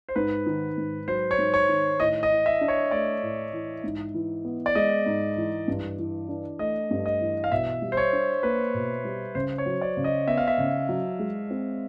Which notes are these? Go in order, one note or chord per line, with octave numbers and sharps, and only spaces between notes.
C5
G#2 B4
D#3
G#2
F#3 C5
C#5
G#2
C#5
D#3
A2 D#5
D#5
E3
E5
D4
C#5
A3 D5
A2
E3
G#2
E3
B3
D5
G#3 D#5
G#2
E3
G2
E3
D4
A3 D#5
G2
D#5
E3
F5
B2 E5
G3
C5
C#5
D4
A#3 B4
B2
G3
C#3 C5
C#5
F#3
D5
C#3
D#5
B3 E5
F5
E5
C#3
F#3
G#3
C4